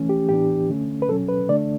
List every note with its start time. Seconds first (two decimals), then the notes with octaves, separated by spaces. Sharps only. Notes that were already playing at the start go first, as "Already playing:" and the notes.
Already playing: E3 A3 C#4
0.09 G4
0.29 A2 E3 B3 D4 G4
0.69 D3 A3 C#4
1.02 B4
1.08 B2 F#3 C#4 A4
1.28 B4
1.48 D3 A3 D4 D5